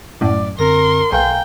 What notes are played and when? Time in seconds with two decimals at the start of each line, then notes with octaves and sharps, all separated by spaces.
0.21 F#2 A2 D5
0.59 F#2 D3 C4 A#4 C6 A#6
1.12 B1 F5 G5 G#5 A#5